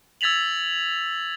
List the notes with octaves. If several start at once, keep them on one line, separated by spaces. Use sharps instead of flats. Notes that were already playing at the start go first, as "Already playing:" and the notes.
E6 G#6 A6 B6 F7 F#7